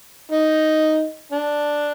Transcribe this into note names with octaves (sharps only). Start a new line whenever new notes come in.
D#4
D4